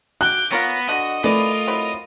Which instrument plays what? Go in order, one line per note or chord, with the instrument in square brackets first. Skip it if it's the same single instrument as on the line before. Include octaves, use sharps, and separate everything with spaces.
[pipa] F#4 [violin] D6 G6 [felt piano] F#6
[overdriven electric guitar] B3 [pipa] F4 A#4 C#5 [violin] A#6
[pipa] D3 F#5 [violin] F#4 [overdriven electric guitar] D#5
[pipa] E3 E4 D5 [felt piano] A3 [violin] F4 A#4 [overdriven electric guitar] D#5
[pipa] F#3 C4 E4